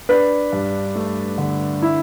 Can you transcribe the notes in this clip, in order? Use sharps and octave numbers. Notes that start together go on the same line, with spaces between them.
D4 B4
G2
A3
D3
E4